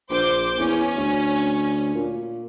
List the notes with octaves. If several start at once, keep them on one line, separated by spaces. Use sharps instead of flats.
A#1 C5 D6 G6
E2 C#4
D2
A#2